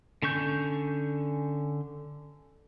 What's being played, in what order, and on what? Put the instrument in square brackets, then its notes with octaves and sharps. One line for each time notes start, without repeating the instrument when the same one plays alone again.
[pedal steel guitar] D3 C#4 C#6 G6